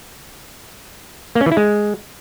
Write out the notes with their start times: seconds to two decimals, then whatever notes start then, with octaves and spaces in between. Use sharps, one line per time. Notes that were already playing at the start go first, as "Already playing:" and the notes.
1.35 A#3
1.41 C#4
1.46 E3
1.52 E4
1.57 G#3